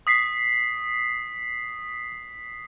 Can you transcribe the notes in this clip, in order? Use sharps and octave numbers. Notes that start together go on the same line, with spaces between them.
D#6 B6 C7